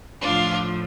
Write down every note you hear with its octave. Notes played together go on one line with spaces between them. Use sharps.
A2 F3 D4 F4